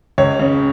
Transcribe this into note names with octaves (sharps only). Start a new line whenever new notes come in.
C#2 C#5
C#3